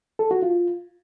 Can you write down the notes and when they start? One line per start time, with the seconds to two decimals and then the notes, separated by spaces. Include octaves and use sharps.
0.19 A4
0.31 F#4
0.42 F4